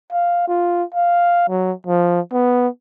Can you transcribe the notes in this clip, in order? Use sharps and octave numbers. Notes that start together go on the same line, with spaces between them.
F5
F4
F5
F#3
F3
B3